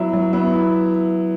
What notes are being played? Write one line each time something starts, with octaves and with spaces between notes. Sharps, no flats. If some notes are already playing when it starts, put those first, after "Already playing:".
Already playing: F#3 B3 E4 E5
F#3
B3 E5
E4